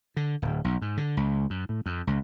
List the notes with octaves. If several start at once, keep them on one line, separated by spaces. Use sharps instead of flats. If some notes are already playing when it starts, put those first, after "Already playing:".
D3
D1
B1
G#2
D3
C#2
F#2
A2
F2
C#2